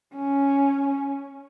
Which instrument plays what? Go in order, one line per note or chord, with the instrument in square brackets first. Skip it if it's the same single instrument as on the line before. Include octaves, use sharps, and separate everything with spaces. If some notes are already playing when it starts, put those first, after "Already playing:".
[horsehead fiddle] C#4